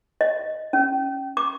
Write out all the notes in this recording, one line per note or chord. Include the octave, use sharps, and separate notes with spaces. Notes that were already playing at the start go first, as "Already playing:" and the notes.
D#5
C#4
D6